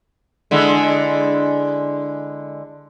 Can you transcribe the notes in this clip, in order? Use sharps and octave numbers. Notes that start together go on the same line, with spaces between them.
D3 G#3 E4